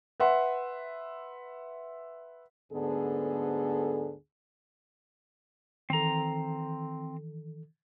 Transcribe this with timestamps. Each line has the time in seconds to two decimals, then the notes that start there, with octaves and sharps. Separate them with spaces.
0.20 B4 E5 F#5 C6
2.73 D2 G#2 D3 B3 G#4 A4
5.90 D#3 E3 C4 A4 A#5